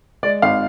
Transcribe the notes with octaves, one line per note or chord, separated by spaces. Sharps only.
G#3 D5
G#1 F5